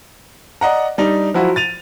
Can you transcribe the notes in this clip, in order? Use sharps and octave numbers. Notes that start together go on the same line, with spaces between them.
D5 D#5 F#5 A#5
G3 D4 D#4
F3 F#3 E4 F#4
A6 D#7 F7